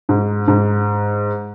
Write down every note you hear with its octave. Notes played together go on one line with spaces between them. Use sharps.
G#2
G#2